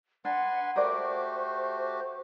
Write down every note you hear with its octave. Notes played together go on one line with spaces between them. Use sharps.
D4 B4 F#5 G#5 C6
A3 F#4 G4 A#4 C5 D5